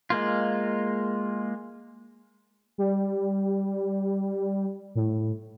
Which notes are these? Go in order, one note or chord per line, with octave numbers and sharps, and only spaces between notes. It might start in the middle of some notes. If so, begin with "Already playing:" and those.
G#3 A#3 F4
G3
A2